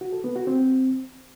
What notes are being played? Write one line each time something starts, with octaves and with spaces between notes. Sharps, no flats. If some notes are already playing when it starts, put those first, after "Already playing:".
F#4
A4
B3
F#4
C4